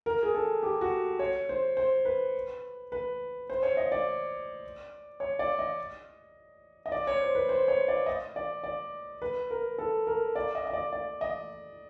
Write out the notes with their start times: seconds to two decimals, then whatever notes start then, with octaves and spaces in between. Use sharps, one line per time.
0.06 A#4
0.23 G#4
0.34 A4
0.63 G4
0.81 F#4
1.19 C#5
1.49 C5
1.77 C5
2.05 B4
2.92 B4
3.50 C5
3.63 C#5
3.77 D#5
3.92 D5
5.20 C#5
5.39 D5
5.59 D#5
6.86 D#5
6.92 D5
7.07 C#5
7.22 C5
7.35 B4
7.49 C5
7.68 C#5
7.88 D5
8.06 D#5
8.36 D5
8.64 D5
9.22 B4
9.51 A#4
9.78 A4
10.07 A#4
10.35 D5
10.55 D#5
10.67 D#5
10.73 D5
10.93 D5
11.21 D#5